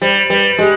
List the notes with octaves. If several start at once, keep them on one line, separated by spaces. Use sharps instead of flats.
G3 C5
G3 B4
G#3 G4